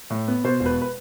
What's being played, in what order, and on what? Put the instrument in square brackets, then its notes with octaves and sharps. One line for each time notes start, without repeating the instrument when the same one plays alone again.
[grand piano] A2
B3
B2 C5
E1
B4
B4